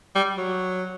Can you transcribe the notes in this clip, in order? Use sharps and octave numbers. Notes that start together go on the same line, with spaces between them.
G3
F#3